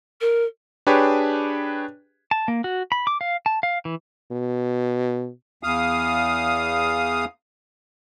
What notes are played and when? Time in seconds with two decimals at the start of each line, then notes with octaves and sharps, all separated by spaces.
0.20 A#4
0.87 D4 G4 G#4 B4 C#5
2.31 A5
2.48 A#3
2.64 F#4
2.92 B5
3.07 D6
3.21 F5
3.46 A5
3.63 F5
3.85 E3
4.32 B2
5.63 E2 F5 D#6